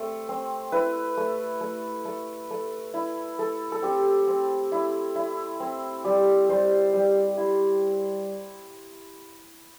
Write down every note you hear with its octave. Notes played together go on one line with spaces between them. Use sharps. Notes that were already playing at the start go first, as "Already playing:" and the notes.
Already playing: A3 C4
C4
E4 B4
A3
A3
A3
A3
E4
A3 A4
A4
C4 G4
C4
E4
E4
C4
G3 G4
G3 C5
G3
E4